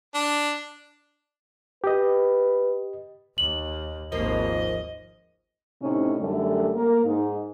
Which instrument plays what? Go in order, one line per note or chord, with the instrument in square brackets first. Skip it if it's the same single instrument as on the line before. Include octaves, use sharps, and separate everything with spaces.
[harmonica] D4
[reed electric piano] G4 D#5 [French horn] B4
[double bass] D#2 [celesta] F#7
[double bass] G#1 D#2 [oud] F3 A#3 [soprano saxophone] D#5
[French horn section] A2 C3 C#4 D#4
F#2 D3 G3 A3
A#3 A#4
G#2 D#4